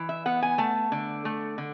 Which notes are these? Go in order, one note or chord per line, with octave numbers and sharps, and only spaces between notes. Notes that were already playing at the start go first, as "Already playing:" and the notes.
Already playing: E3
E5
B3 F#5
G#5
A3 A5
D3
A3
D3